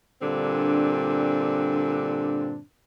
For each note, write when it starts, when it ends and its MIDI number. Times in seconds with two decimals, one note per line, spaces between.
0.22 2.60 43
0.22 2.60 46
0.22 2.60 50
0.22 2.60 60
0.22 2.60 62